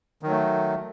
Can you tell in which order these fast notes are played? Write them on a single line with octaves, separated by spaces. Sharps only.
D#3 F#3 A3